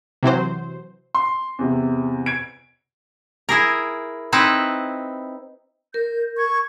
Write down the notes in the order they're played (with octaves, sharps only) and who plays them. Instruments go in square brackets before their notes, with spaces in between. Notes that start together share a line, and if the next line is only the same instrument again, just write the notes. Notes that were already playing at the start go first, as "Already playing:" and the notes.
[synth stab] C3 E3 F#3 C5
[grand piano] C6
E2 C3
G#6 D7
[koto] E4 G#4 A#4
C4 D#4 E4 B4
[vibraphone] A#4 [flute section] G6
[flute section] C#6 G#6